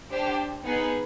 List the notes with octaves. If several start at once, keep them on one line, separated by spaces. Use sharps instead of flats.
D4 G4 C5
B3 D#4 G#4 B4